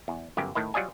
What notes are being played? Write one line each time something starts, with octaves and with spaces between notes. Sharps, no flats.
E2
G1 F#2 G4
A2 D#3 E4
F#3 G3 F4 D5 D#5 G#5